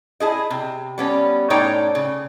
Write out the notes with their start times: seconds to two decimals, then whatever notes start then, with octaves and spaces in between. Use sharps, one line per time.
0.20 E4 G#4 D#5
0.50 C3
0.98 G3 B3 C#4
1.50 A2 C#4 D#4 C#5 D5 G5
1.95 C#3